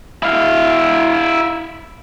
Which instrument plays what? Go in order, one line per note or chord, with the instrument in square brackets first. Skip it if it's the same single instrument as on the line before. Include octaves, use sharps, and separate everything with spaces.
[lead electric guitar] E4 F5